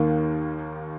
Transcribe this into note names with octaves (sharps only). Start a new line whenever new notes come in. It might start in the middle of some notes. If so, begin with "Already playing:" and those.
Already playing: D#2 D#3 A#3